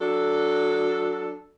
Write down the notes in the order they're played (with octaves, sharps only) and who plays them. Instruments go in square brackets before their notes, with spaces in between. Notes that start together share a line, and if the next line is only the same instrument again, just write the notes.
[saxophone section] F#3 D4 A4